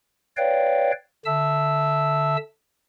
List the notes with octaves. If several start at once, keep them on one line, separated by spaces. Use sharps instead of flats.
B4 C#5 D5 F5 G5
D3 E5 A5 E6